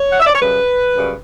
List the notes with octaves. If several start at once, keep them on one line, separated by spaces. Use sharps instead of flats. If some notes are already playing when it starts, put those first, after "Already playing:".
Already playing: C#5
F#5
E5
D5
C#5
F#2 C#3 G3 B4
F#2 C#3 G3